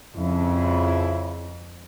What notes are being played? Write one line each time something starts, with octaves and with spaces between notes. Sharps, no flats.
F2 C#3 E4